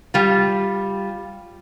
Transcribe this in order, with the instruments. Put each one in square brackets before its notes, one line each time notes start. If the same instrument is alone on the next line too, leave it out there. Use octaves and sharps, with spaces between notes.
[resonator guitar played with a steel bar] G3 F4